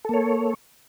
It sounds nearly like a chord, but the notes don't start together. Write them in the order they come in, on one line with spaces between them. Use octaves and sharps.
A4 A#3 C#5